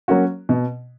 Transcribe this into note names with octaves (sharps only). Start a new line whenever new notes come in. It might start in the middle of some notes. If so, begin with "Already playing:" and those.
F#3 A#3 C#4 F#4
B2